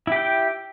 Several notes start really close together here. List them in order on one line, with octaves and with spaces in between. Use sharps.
E4 G4 G5